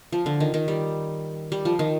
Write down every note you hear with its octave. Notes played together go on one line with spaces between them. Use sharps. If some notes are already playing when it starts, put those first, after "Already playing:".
F3
D3
D#3
D#3
G3
G3
F3
D#3